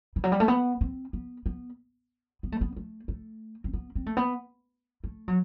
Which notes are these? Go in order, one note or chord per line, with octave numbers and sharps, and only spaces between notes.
E3
F#3
G3
A3
B3
C4
B3
B3
B3
A3
B3
A3
A3
C4
B3
C4
A3
B3
A3
F#3